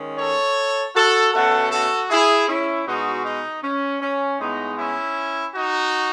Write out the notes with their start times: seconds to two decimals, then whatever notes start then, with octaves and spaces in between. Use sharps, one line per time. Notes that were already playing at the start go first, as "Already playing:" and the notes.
Already playing: D#3 G#3 C#4
0.18 A4 C#5
0.95 F#4 A4
1.33 B2 A3 C#4 F#4 A4
1.71 F#4 A4
2.10 E4 G#4
2.48 C#4 E4
2.87 B2 G#3 B3 D#4 F#4
3.25 D#4
3.63 C#4
4.01 C#4
4.40 A2 G#3 B3 D#4
4.78 C#4 E4
5.54 D#4 F#4